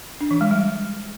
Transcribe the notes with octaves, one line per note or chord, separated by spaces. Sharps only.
D4
E3
G#3
G3